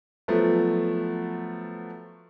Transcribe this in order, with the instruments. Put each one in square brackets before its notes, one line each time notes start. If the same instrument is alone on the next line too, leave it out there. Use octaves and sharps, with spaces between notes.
[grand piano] F3 F#3 A3 B3